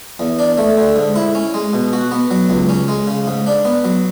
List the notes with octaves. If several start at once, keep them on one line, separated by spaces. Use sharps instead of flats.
E2
D4
A3
D3
G#2
E4
C#4
G#3
B2
F#4
B3
F#3
C#2
C#4
G#3
C#3
G#2
D4
B3
F#3